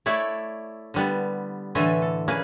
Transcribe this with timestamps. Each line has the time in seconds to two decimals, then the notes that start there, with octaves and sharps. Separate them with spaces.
0.06 A3 E4 C#5 D5 E5
0.94 D3 G3 B3
1.75 A2 D3 E3 A3 E5 G#5
2.02 A4
2.28 C#3 A#3 G#4 B4